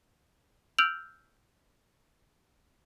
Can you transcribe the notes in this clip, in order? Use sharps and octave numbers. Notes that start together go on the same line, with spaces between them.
E6 F6 G6 D7 F7 F#7